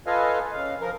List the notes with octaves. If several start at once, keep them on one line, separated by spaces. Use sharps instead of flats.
F4 A4 B4 D#5 F5 G#5
C#3 F5
F3 A#4